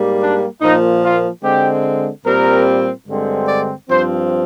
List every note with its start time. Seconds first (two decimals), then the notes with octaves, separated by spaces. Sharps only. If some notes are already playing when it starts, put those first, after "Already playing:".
Already playing: G#2 G3 A#3
0.21 D4
0.62 A#2 F3 A#3 D#4
1.03 F4
1.44 D3 G#3 C4 G4
2.25 A#2 G3 C4 A#4
3.08 G2 D3 G#3 C4
3.48 D5
3.89 G2 F3 C4 C5